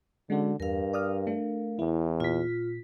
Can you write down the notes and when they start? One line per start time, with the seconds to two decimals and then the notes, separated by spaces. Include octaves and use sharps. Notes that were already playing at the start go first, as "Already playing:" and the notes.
0.30 D3 G#3 C#4 F#4
0.60 E2 G2 A#4 F5
0.93 D5 D#6 F6
1.27 A3 D4
1.79 E2 E4
2.20 A#2 F4 B6